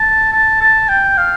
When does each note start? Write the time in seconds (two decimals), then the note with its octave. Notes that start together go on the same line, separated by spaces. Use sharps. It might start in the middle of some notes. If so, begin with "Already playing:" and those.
Already playing: A5
0.33 A5
0.61 A5
0.89 G5
1.17 F5